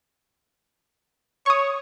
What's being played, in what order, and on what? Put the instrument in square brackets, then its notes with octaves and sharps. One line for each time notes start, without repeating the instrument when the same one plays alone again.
[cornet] C#5 [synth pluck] C#6 D#6